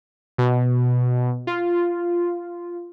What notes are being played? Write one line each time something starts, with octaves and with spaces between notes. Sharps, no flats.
B2
F4